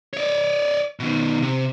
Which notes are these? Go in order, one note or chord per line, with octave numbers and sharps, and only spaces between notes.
C#5 D5
B2 D#3
C3